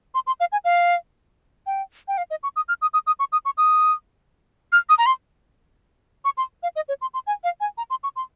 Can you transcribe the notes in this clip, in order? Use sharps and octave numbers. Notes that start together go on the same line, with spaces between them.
C6
C6
F5
G#5
F5
G5
G5
F5
D#5
C#6
D#6
F6
D#6
D#6
D#6
C#6
D#6
C#6
D#6
F6
D#6
A#5
C6
C#6
C6
F5
D#5
C#5
C6
C6
G#5
F5
G#5
A#5
C6
C#6
C6